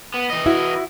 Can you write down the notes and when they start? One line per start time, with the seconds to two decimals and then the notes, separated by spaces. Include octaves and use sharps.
0.14 B3
0.30 E3 D#5
0.46 E4 F#4 E5